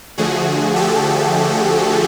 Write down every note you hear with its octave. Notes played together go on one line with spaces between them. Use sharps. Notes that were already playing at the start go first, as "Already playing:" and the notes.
D3 F3 A3 F#4 G#4
G4 A4